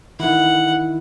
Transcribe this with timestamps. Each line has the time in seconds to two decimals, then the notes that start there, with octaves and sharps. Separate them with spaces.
0.20 D#3 E4 F#5